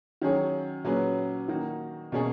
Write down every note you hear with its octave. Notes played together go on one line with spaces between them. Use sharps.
D#3 F#3 C#4 G#4 C#5
A#2 F#3 C#4 G#4 B4
D#3 A#3 D#4 F#4
B2 A#3 C#4 G#4 C#5